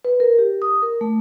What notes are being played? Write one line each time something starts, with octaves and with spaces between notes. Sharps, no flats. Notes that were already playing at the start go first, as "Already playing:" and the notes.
B4
A#4
G4
D#6
A#4
A3